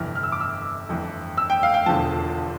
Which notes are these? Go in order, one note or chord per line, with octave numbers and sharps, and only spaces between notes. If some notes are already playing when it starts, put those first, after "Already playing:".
Already playing: G1 F2 C3 E3 F6
F6
E6
D6
E6
G1 F2 E3
E6
G5
F5
G5
E1 E2 D3 F3 A5